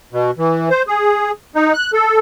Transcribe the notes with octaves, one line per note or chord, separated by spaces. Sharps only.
B2
E3
C5
G#4
D#4
F#6
A4